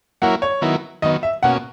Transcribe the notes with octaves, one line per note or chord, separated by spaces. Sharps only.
F#3 A#3 E4 A#4 C#5 F#5
C#5
D#3 F#3 B3 E4 A#4
D#3 F#3 B3 D#5
E5
B2 A#3 C#4 F#4 F#5